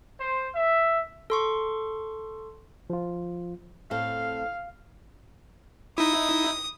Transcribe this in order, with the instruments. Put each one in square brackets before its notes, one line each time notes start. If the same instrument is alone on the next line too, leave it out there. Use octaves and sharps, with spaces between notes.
[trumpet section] C5
E5
[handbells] A4 C6 C#6
[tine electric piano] F3 F4
[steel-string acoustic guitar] A2 C4 A4 [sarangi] F5
[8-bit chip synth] D#4 E4 [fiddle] D#6